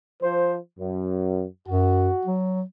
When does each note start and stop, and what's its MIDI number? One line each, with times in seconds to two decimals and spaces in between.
0.22 0.57 53
0.22 0.57 72
0.80 1.45 42
1.68 2.11 42
1.68 2.33 66
2.25 2.63 54